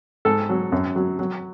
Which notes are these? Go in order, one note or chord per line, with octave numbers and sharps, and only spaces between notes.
G#2 A4
F#3
F#2
F#3
F#3